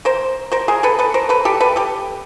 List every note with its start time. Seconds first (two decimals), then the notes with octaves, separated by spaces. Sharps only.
0.05 A#4 C5
0.52 A#4 C5
0.68 G#4 A#4
0.83 A4 B4
0.99 A4 B4
1.14 A#4 C5
1.29 A4 B4
1.45 G4 A4
1.60 A4 B4
1.76 G4 A4